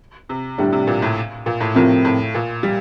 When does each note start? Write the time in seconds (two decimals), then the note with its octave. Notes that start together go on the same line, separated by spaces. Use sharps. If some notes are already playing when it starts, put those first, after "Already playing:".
0.29 C3
0.58 A2 D3 G3 D4
0.73 C3
0.87 A#2
1.02 A2
1.46 A#2
1.60 A2
1.75 A2 C3 F3 C4 F4 A#4
2.05 A2
2.35 A#2
2.63 G3